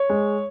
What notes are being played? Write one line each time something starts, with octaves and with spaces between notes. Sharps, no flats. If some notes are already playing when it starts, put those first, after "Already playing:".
Already playing: C#5
G#3